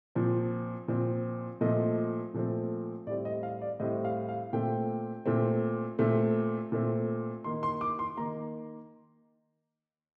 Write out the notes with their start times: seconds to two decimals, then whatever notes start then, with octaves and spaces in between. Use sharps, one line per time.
0.15 A#2 F3 C4
0.88 A#2 F3 C4
1.61 A#2 F3 A3 C4 D#5
2.34 A#2 F3 A3 C4
3.07 A2 G3 C4 D5
3.25 D#5
3.43 F5
3.61 D5
3.80 A2 G3 C4 D#5
4.05 F5
4.29 F5
4.53 A#2 A3 C4 G5
5.26 A#2 A3 C4
5.99 A#2 A3 C4
6.72 A#2 A3 C4
7.44 D#3 A#3 C6
7.63 C6
7.81 D6
7.99 C6
8.17 D#3 A#3 A#5